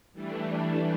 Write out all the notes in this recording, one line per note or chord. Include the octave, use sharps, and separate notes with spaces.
E3 G3 A3 D4